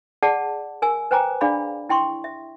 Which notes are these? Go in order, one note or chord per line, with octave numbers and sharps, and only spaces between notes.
G#4 D5 F#5 A5
A#4 G#5 E6
B4 C5 G5 G#5 A#5 D6
D4 G#4 D5 F5 B5
E4 G5 C6 C#6
E5